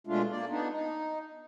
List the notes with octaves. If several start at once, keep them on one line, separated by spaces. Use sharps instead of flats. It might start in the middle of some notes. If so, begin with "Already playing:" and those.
B2 G#3 A3 D4 F4
A#3 D5
B3 D4 D#4
D#4